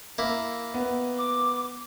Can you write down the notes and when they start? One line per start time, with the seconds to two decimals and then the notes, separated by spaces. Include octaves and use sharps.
0.18 A#3 E4
0.74 B3
1.18 D6